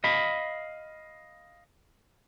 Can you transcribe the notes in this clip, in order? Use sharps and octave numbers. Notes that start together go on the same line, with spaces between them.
D#5 F5 B5